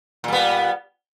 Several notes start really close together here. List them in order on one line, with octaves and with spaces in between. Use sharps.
A#2 G3 B3